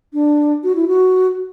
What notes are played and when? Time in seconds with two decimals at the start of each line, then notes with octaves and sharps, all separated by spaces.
0.13 D4
0.64 F#4
0.75 E4
0.88 F#4